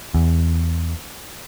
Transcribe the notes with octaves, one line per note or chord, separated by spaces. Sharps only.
E2